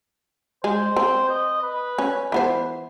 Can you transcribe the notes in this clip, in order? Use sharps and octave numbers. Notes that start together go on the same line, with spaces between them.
G#3 C5
C4
D#5
B4
C#4
E3 B3 C5